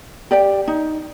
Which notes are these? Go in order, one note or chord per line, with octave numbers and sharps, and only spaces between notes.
G4 D5 G5
D#4